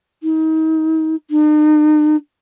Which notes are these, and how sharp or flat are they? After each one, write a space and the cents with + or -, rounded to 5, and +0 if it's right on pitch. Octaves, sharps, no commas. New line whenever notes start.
D#4 +35
D#4 -45